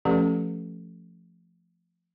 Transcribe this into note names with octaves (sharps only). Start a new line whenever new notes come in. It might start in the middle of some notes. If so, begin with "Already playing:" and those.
F3 A3 C#4 G4 A4 B4